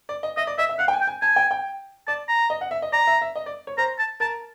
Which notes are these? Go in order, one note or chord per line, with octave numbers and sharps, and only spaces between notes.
D5
D#5
D#5 E5
D5
D#5 E5
E5
F5 F#5
G5
G#5
G5
G#5
G#5 A5
G5
G5
D5 A5
A#5
D#5
F#5
E5
D#5
D5 A#5
E5
E5
D#5
D5
C#5
C5 A#5
A5
A#4 A5